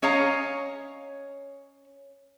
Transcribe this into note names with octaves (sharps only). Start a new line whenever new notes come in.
C#4 C#5 D#5 F5 A#5